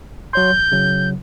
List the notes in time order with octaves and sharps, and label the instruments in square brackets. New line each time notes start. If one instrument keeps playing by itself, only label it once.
[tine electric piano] F#3 C#5 C6 [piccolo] G6
[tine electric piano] A1
C#3 F#3